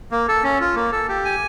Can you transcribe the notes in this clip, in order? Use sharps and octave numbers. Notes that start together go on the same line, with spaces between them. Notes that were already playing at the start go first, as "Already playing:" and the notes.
A#3
A4
C#4
F4
A#3
A4
G4
G#5